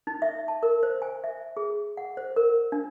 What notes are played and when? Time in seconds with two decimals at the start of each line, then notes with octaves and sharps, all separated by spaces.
0.07 D#4
0.22 E5
0.48 A5
0.63 A#4
0.83 C5
1.02 G#5
1.24 E5
1.57 G#4
1.97 F#5
2.17 C5
2.36 A#4
2.72 D4